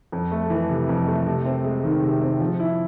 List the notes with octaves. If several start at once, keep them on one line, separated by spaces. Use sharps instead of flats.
F2
A3
E3
C3
F2
A3
C3
C4
G#3
D#3
C3
C4
F3
E4